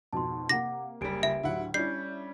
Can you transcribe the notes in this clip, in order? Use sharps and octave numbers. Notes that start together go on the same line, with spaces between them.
F2 G#2 B2 A5 C6
C3 A#3 F#5 D6 A#6
F#1 G3 G4 D7
C#2 E5
D2 A2 F#3 E4 F#5
G3 C#4 D4 E4 G6 C7